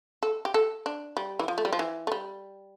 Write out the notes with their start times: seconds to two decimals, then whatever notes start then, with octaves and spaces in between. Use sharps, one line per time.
0.23 A4
0.45 G4
0.54 A4
0.86 D4
1.17 G3
1.39 E3
1.48 F3
1.58 A3
1.65 G3
1.73 F3
1.79 E3
2.07 A3
2.12 G3